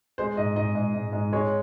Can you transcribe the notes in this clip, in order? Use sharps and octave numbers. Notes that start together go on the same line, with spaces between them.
G#3 C5
G#2 D#5
G#2 D#5
G#2
G#2
G#2
G#3 C#5